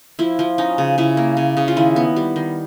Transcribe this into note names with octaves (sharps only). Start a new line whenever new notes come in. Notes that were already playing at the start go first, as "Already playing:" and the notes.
F3 E4
F3
C#4 D#4
C#3
C#3 E4
A#3
C#3
C#3
F4
D#3 E4
B3
G3
D#3